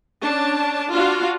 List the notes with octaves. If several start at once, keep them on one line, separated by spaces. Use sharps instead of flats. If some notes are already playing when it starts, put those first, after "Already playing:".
C#4 D4 A5
D4 F4 F#4 F5